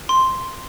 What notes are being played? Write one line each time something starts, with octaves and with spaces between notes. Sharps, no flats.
C6